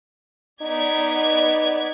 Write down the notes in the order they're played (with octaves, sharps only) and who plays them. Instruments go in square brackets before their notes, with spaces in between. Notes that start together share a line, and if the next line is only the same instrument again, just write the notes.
[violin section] B3 D5 G#6 [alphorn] D#4